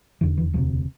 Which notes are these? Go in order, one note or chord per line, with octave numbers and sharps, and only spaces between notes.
F1 E2 D3 E3
E3
E1 D2 C3 F3